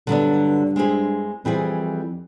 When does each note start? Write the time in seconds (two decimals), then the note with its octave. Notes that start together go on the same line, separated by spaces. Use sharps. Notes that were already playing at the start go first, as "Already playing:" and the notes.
0.07 G2 D3 F#3 B3 D4
0.76 G#3 C4 E4 G#4
1.45 F2 E3 G3 C4 E4 G#4